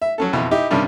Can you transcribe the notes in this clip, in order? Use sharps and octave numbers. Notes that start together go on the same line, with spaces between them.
E5
F#3 C#4 A4
F2 B2 E3
D#4 E4 G4
G2 C3 D#3 G3 C#4 D4